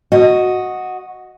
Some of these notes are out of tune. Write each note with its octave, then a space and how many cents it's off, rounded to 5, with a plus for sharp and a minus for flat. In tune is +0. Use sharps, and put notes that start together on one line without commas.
F#4 -5 D#5 +0